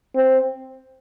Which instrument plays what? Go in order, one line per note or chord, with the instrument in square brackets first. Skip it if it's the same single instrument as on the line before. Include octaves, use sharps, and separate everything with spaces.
[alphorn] C4